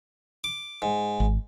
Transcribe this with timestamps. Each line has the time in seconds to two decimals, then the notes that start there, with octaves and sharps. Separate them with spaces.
0.44 D6
0.82 G#2
1.20 G#1